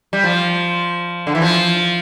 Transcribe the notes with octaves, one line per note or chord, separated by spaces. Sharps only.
G3
F3
D3
E3
F3